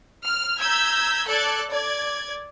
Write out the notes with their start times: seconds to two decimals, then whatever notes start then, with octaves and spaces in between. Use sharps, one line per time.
0.25 F6
0.60 A#5 E6 G6 G#6 B6
1.28 A4 D5 F#6 G#6 A6
1.70 D5 G#6